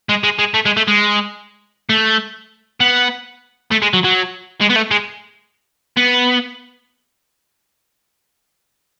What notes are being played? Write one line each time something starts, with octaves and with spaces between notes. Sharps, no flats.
G#3
G#3
G#3
A3
G#3
A3
G#3
A3
B3
A3
G#3
F#3
F#3
G#3
B3
A3
G#3
B3